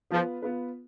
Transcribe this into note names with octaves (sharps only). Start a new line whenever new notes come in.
F3 B3 F4 B4
B3 F4 B4